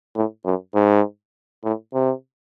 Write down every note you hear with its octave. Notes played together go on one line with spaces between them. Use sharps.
A2
F#2
G#2
A2
C3